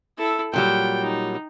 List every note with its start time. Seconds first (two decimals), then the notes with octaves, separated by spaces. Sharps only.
0.18 E4 A4
0.54 A#2 F#3 G3 G5
1.02 D#4